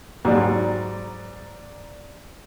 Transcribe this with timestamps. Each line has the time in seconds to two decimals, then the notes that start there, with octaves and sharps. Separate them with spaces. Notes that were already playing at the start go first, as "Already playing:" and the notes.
0.25 G#2 F#3 G3 D5 A#5